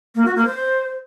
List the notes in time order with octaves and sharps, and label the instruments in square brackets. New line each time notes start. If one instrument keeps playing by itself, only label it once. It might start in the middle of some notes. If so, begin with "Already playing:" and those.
[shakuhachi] A#3
F#4
A#3
C5